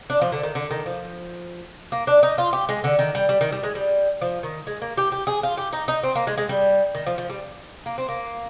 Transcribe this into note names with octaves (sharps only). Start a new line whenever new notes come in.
D4
F3
D3
D#3
D3
D#3
F3
A#3
D4
D#4
F4
G4
G#3
D3
D#3
G3
G3
D#3
G3
G#3
G3
F3
D#3
G#3
A#3
G4
G4
G#4
F4
G4
D#4
D#4
C4
A#3
G#3
G#3
G3
D#3
F3
F3
G3
A#3
C4
A#3